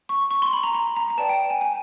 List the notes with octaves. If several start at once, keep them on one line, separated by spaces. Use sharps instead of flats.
C#6
C#6
C6
B5
A#5
A#5
A#5
A#5
B4 D5 G5 A5
G5
G#5
G#5